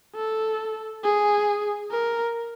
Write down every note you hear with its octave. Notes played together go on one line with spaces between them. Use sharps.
A4
G#4
A#4